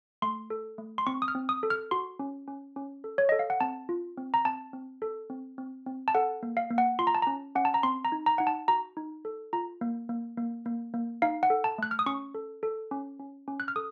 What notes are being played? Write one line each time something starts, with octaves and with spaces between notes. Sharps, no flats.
A3 C6
A4
A3
C6
C4 C#6
D#6
F6
C4
D#6
A4
F6
F#4 C6
C#4
C#4
C#4
A4
C#5
A4 D#5
F5
F#5
C4 A5
F4
C4
A#5
C4 A5
C4
A4
C4
C4
C4
A5
A4 F#5
A#3
F5
A#3
F#5
F4 C6
A#5
A5
C#4 A#5
C#4 F#5
A5
A#5
C4 C6
A#5
D#4
A#5
D#4 F#5
A5
F#4 A#5
D#4
A4
F4 A#5
A#3
A#3
A#3
A#3
A#3
D#4 F5
F#5
A4
A5
A3 F#6
F6
D#6
C#4 C#6
A4
A4
C#4
C#4
C#4
F#6
F6
A4 D#6